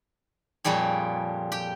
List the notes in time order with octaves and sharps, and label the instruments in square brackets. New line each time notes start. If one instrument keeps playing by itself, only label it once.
[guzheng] F2 A#2 G3 G#4 C#5
G4 G5